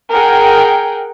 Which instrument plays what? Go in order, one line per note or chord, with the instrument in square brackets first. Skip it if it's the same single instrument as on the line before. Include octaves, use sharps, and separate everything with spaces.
[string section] G#4 A#4 F#5 G5